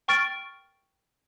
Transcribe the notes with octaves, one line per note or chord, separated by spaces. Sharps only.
G5 C#6 F6 A6 D7